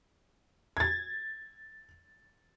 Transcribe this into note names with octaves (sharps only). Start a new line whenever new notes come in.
G#6 A6